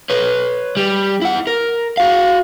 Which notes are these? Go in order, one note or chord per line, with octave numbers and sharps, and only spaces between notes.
B4 C#5
G3
E4 F#5
A#4
F#4 F5